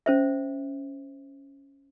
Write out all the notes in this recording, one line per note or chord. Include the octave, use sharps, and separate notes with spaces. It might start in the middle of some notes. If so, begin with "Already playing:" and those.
C#4 C5 E5